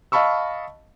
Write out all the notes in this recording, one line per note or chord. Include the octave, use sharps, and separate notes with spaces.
D#5 F5 A5 B5 C#6 E6